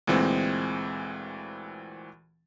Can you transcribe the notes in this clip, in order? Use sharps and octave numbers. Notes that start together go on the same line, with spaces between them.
D2 A#2 E3 G#3 C4